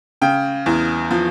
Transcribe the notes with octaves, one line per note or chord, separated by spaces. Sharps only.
C#3 G5
E2
F3